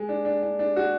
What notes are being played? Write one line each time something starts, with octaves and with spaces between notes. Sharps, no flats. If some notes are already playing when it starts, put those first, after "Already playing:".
Already playing: G#3
D4
D4
D4
D4
F#4